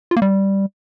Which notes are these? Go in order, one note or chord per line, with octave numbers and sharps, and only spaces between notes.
F4
A#3
G3